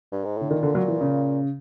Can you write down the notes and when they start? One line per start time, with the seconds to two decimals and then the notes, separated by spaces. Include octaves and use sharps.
0.12 G2
0.25 G#2
0.38 A2 D3
0.50 A#2 D#3
0.63 D3
0.75 F#3
0.88 E3
1.01 C#3